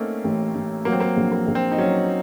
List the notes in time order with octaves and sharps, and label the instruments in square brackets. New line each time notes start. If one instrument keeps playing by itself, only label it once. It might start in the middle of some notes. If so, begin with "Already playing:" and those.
Already playing: [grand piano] A3 A#3 C4 C#4 D#4
[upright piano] A1
A1
[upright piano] F#3 [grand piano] A#3
[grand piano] C4
A#3
[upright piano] A#1
[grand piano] A#3
[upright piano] A#1
[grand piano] C4
D#4
[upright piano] F#3 [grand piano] C#4